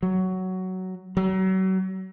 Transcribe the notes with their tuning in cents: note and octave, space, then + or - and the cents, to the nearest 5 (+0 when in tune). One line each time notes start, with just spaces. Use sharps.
F#3 +10
F#3 +35